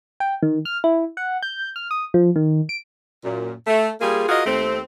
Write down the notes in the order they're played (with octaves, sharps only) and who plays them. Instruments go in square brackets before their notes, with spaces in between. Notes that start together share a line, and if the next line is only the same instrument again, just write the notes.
[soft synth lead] G5
D#3
F6
E4
F#5
G6
F6
D#6
F3
D#3
D7
[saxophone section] F#2 A#2
A3
G3 A#3 F4 G#4
F4 F#4 G#4 A#4 D#5
D#2 A3 C4